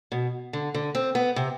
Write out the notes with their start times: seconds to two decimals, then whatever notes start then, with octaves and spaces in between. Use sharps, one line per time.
0.12 B2
0.53 D3
0.74 D3
0.95 C4
1.15 B3
1.36 C3